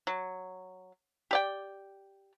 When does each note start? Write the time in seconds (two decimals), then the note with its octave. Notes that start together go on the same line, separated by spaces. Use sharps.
0.07 F#3
1.31 G4 D5 G5